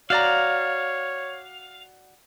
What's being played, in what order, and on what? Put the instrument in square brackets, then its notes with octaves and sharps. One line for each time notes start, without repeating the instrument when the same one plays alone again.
[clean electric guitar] F#4 D5 A#5 [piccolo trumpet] C#5 [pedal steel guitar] F5